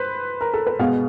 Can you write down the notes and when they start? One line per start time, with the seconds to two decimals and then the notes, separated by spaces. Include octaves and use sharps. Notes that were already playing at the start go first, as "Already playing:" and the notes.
Already playing: B4 C5
0.41 A#4
0.54 A4
0.67 B4
0.79 B2 G#3 B3 F5